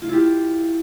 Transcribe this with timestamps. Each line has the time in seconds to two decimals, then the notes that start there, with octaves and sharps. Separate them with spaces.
0.02 F4
0.06 F5
0.09 E4
0.13 G4